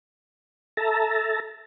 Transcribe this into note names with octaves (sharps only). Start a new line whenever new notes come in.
A4 E5 A5 A#5